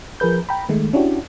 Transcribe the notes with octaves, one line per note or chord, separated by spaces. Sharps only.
F3 G#4 A#4 B4 G6
G5 A#5 B5
D#3 G#3 A3
C#4 D4 E4 F#4 G4